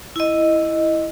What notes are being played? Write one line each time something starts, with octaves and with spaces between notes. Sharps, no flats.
E4 D#5